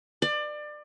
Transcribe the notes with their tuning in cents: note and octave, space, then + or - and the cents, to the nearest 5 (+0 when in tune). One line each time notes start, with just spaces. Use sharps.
D5 +25